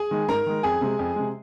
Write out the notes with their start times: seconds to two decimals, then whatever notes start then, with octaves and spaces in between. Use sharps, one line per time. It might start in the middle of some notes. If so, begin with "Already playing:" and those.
Already playing: G#4 G#5
0.11 D#3 G#3
0.28 G#2 A#4 A#5
0.46 D#3 G#3
0.63 F2 G#4 G#5
0.81 C3 G#3
0.99 F2
1.16 C3 G#3